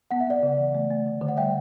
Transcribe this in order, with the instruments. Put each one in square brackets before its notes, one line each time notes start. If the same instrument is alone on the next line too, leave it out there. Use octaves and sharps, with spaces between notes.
[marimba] B3 [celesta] F#5
[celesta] E5
[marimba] B3 [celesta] D5 F#5
[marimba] C#3
E3
A3
A3
D3
D3
[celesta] F#5
[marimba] G3 [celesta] E5 G5